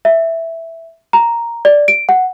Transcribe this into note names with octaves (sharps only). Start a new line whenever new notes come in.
E5
A#5
D5
D7
F#5